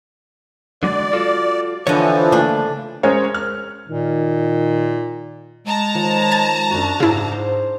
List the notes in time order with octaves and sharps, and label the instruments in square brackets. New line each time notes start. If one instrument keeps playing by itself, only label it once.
[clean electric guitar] D3 F#3 G#3 [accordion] D5
[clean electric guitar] F4 F#4 A4
[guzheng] D3 D#5 [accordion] E3 F3 [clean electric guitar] C#5
[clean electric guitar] C#3 A3 A#3 [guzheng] D4
[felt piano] G#3 C#4 A#4 C5 C#5
F6
[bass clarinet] A#2 [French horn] D#3
[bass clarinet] G#3 [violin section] A5 A#5
[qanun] D#3 F3 C#5
[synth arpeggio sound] G#6 A6
[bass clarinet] F#2 [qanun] D4 F#4
[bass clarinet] G#2 [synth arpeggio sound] C#3 E4 [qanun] G#4
[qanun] C5